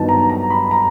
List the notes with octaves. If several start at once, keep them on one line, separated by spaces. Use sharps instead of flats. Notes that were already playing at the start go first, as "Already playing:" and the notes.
Already playing: G2 D#3 F#3 B3 D#4 A5
A#5
A#5
B5
A#5